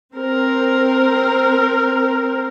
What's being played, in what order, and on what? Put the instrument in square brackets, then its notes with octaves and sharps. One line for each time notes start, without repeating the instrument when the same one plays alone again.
[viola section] C4 A#4